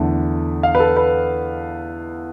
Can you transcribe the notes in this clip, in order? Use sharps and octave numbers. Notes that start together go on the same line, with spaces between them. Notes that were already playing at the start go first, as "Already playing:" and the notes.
Already playing: E2 D3 A3
F5
B4
A4
B4